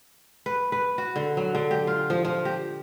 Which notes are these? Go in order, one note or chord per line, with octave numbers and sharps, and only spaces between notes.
B4
B4
F#4
D3
F#3
D3
G4
F4
F3
F3
G4